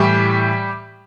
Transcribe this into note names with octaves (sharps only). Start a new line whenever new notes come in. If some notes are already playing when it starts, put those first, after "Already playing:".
Already playing: A2 E3 G3 G4